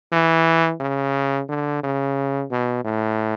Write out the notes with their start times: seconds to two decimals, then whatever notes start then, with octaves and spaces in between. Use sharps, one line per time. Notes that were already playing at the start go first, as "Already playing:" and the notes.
0.12 E3
0.80 C#3
1.49 D3
1.83 C#3
2.51 B2
2.84 A2